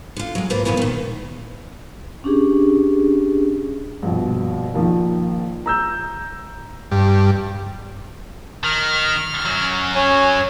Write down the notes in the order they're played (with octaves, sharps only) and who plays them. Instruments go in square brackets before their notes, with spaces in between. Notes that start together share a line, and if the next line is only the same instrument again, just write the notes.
[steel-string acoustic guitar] D3 F4
F#3 G#3
G#2 A#3 F4 B4 C5
F#2 A#2 C#3 E3 B3 F#4
A#2 D#3
[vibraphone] C#4 D4 G4 G#4
[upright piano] A#1 G2 B2
A#1 D#3 F3 A#3
A#5 E6 G6
[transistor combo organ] G2
[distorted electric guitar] D#3 [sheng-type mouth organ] F6
[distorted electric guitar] F#2 F#3
[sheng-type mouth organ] C#4 C#5 G#5